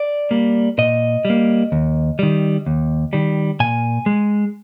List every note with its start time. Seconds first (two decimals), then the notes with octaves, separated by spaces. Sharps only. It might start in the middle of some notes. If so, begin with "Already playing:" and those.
Already playing: D5
0.31 G3 A#3
0.78 A#2 D#5
1.25 G3
1.30 A#3
1.72 D#2
2.19 D#3 G3
2.66 D#2
3.13 D#3 G3
3.60 A#2 G#5
4.06 G#3